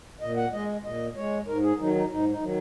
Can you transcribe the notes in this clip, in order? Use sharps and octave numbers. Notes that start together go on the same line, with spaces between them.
A#2 D#5
F#5
G#3 D#5
A#2 D#5
G#3 C#5
G#2 A#4
G#4
D#3 F#3 D#4
D#4
G#2 D#4
D#4
D#3 F#3